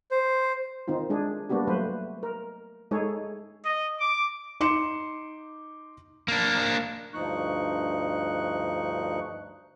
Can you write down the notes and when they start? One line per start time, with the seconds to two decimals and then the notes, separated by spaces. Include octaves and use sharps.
0.11 C5
0.88 D#3 C4 D#4 F4
1.10 G#3 D4 G#4
1.49 G3 A#3 B3 D4 F#4 G4
1.67 F#3 A3 B4 C5
2.23 A#4
2.91 G#3 D#4 G#4 A4 C#5
3.65 D#5
3.98 D6
4.60 D#4 C6 D6 C#7 E7
6.28 A#3 D4
7.14 D2 G2 F3 D#4 C#6 F#6